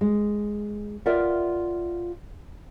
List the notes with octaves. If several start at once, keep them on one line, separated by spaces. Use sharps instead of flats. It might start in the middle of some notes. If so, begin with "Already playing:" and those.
G#3
F4 A#4 D5 E5 F#5